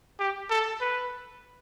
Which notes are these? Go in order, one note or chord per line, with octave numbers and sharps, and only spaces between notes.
G4
A4
B4